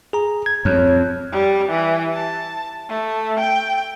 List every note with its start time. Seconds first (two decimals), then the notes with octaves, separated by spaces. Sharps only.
0.13 G#4 A#5
0.46 G#6
0.65 F2 C#5
1.32 G3
1.68 E3
2.13 A5
2.89 A3
3.40 G5